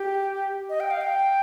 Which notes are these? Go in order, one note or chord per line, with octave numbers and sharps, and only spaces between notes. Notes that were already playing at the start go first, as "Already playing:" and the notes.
Already playing: G4
D#5
G5
F5
G5